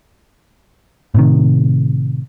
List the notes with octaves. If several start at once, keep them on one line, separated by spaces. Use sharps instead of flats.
A2 C3 D#3